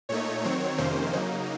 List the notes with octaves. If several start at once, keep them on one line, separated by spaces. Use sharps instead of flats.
A#2 A3 D#4 C#5
D#3 F#3 C4 C#5
F2 C3 D#3 A#3 C#4 C5
C#3 F#3 A#3 D#4